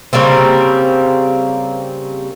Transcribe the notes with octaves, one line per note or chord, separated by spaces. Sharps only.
C#3 G3 A#3 C4